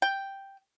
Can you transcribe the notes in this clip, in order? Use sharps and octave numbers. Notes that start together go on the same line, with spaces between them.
G5